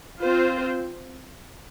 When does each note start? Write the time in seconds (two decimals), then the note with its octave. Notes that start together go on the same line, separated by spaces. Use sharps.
0.21 C4 F4 C5